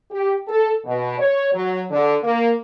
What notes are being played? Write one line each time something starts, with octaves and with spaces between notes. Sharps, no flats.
G4
A4
B2
C#5
F#3
D3
A#3